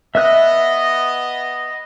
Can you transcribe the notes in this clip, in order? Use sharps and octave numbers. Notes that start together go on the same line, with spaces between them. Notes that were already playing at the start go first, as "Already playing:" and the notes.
B3 D#5 E5 F#6